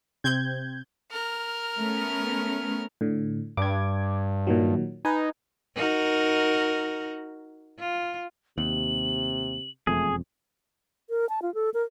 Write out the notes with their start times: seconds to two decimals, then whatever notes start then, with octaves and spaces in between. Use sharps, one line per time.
0.24 C3 C4 G6 G#6
1.11 A#4 F6
1.79 A3 B3 C#4
3.01 A2 D3
3.57 G2 D6 G#6
4.47 A#2 D#3 F#3
5.05 D#4 B4 G#5
5.76 D#4 F#4 A#4
7.79 F4
8.58 D#2 C3 F#7
9.87 E1 F2 A3 G#4
11.10 A#4
11.29 A5
11.42 F4
11.55 A4
11.74 A#4